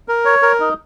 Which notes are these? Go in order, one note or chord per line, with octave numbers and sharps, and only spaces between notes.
A#4
C#5
A#4
D#4